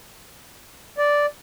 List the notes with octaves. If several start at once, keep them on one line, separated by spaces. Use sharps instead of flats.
D5